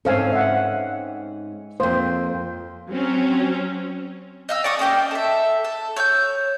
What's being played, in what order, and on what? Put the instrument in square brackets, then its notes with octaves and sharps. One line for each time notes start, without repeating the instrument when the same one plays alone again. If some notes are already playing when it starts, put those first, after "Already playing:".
[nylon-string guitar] G#2 C4 C#4 [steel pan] A4 F5 G#5
[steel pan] E5 F#5
[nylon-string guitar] F2 A#3 [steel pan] C5
[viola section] F#3 C4 C#4
[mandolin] D#5 F5 E6
D5 A5 C#6 D#6
A#3 C#4 G4 D#5
A4 E5
A4
C#5 E6 F#6 G6